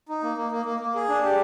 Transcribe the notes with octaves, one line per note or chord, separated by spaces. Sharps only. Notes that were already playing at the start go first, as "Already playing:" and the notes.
D#4
A#3
A#3
A#3
A#3
A#3
G#4
D4
G4